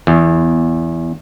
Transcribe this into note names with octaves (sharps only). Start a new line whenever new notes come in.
E2